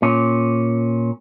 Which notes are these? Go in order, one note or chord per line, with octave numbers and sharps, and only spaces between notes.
A#2 C#4